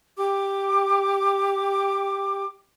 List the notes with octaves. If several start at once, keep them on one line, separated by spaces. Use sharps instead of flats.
G4 D6